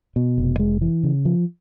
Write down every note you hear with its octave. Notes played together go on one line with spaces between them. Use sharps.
B2
F1
G#3
E3
C#3
F3